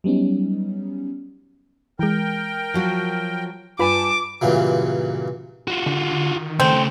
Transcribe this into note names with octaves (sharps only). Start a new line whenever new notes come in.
F#3 G3 B3 C#4 D#4
E3 G#3 A#4 G5
F3 F#3 F#4
G2 F4 B4 G#5 A5 B5 D6
G2 A#2 C#3 E3 F#3
F4 F#4
D3
D3
D#3
C#3 A3 C4